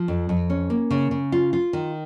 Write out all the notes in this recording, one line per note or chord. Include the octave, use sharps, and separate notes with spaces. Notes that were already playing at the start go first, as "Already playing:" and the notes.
Already playing: F3
F2
F2
C#4
A#3
C#3
C#3
F4
F4
D#3